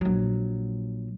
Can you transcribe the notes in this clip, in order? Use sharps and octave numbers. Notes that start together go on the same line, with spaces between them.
A#1 F#3